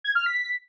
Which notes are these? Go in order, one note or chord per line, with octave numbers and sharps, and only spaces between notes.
G#6
F6
B6